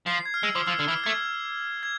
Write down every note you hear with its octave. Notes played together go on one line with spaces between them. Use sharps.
F3 C7
G#6
F6
G#3 E6
F3 D6
F3 E6
D3 F6
E3
F6
A3 G#6
G#6